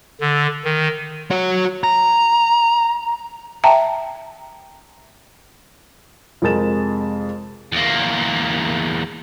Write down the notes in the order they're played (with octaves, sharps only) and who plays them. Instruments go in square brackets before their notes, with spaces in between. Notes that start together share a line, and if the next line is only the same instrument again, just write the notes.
[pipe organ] D3
D#3
[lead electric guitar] F#4 C#5
A#5
[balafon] E5 G5 A5 A#5
[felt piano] F2 C3 G#3 A#4 A6 E7
[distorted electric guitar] E2 A#3